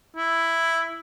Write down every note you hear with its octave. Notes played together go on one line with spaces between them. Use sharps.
E4